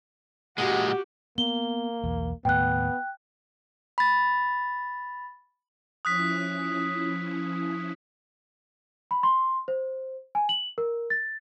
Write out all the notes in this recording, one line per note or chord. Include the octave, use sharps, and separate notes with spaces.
A#2 G#3 F#4 G4 F#5
A#3 B3 G7
B1 E2
D#2 A2 B3 G5 F#6
B5 A6
F3 C#4 E4 D#6 F#6 B6
B5
C6
C5
G#5
F#7
A#4
A6